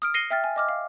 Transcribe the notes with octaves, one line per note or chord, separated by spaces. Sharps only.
D#6 F6 D7
A#6 C7 C#7 D#7 G7
E5 G5 F6 A6
G#5
D#5 D6 F6
F5